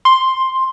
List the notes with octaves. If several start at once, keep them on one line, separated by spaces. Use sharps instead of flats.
C6